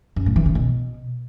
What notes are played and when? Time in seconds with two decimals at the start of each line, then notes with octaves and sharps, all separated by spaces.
0.16 F#2
0.26 A2
0.36 E3
0.45 C#3
0.55 B2